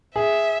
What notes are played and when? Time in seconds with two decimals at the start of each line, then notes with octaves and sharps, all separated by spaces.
0.15 G#4 E5